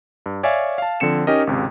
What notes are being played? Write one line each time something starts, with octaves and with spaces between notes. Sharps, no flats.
G2
C#5 D5 E5 F5 G#5
F5 A5
D3 F3 C4 C#7 E7
C#4 D#4 G4 A#4 D#5
G#1 C#2 C3